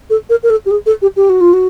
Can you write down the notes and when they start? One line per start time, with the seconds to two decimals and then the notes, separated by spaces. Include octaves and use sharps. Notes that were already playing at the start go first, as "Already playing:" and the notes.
0.10 A4
0.29 A#4
0.43 A#4
0.50 A4
0.65 G4
0.71 G#4
0.86 A4
1.02 G4
1.16 G4
1.29 F#4
1.40 F4
1.53 F#4